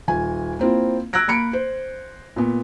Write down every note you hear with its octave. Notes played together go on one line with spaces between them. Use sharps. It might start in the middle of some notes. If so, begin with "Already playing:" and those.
D#1 G#5
A#3 C4 E4 F4
E6 F#6 G#6 A#6 D7
A#3 B5 C#7 D7
C5
A#2 B3